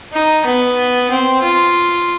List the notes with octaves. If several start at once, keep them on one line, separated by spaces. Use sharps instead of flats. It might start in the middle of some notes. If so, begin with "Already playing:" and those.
D#4
B3
C4
F4